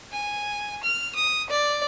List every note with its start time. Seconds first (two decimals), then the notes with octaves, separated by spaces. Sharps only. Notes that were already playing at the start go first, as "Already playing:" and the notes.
0.12 G#5
0.83 F6
1.15 D#6
1.50 D5